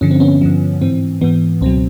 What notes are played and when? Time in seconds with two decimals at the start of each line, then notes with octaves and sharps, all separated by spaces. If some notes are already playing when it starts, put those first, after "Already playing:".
0.01 G2 D3 F3 C#4
0.11 C4
0.20 B3 C#4
0.41 G2 D3 F3
0.81 G#2 E3 C4
1.21 G#2 E3 B3
1.61 C#2 B2 F#3 C4